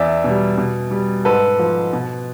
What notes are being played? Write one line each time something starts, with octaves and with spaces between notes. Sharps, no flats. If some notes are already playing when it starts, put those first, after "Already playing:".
Already playing: E2 D5 E5
B2 G3
B2
G3
G#2 A4 B4
F3
B2